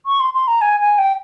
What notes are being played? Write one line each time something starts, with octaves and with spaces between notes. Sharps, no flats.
C#6
C6
C6
A#5
G#5
G#5
G5